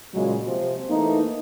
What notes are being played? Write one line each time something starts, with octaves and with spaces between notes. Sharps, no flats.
A#2 C#3 F#3 G#3
C3 F3
E3 A3 A#3 D#4